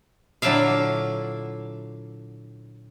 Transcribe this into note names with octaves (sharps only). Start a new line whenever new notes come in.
A#2 D3 F#3 E4 E5 F5